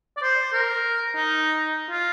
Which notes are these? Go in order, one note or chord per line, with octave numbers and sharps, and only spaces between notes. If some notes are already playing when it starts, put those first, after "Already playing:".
D5
C5
A#4
D#4
F4